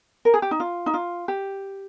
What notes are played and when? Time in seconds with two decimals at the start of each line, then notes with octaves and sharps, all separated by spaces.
0.25 A#4
0.34 G#4
0.42 G4
0.51 D#4
0.60 F4
0.86 D#4
0.94 F4
1.28 G4